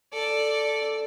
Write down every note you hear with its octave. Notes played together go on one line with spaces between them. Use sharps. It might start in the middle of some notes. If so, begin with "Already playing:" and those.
A4 D5